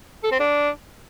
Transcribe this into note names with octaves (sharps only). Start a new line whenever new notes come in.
A4
C4
D4